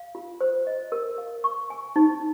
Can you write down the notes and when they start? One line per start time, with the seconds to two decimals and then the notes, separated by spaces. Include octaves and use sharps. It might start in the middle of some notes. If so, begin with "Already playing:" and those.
Already playing: F5
0.15 F4
0.41 C5
0.67 D#5
0.92 A#4
1.18 F5
1.44 C#6
1.70 G#5
1.96 D#4